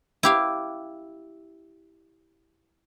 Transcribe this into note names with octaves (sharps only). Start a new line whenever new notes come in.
E4 G4 F5